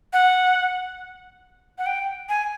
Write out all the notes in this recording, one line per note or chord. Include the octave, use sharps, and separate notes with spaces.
F#5
F#5
G5
G#5